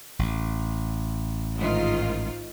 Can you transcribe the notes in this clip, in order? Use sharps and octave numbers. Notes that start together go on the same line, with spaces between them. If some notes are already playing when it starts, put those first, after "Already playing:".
A1
G#2 D#3 F4